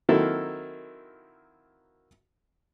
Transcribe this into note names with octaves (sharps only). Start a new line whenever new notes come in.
D#3 F#3 A#3 C4 E4 A4